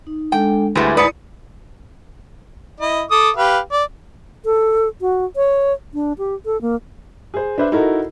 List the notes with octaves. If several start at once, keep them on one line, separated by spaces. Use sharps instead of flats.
D#4
G#3 D4 A4 G5
D2 G3 G#3 E4 B4 E5
G#2 E4 B4 D5 D#6 C#7
E4 D#5
A4 D6 D#6
G4 B4 F5
D5
A4
F#4
C#5
D4
G4
A4
A#3
G#4 C5
D4 B4 C5 E5
D#4 E4 F#4 A4 A#4